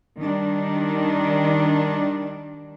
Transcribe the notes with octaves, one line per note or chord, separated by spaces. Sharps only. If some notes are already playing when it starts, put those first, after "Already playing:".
D#3 G3 D4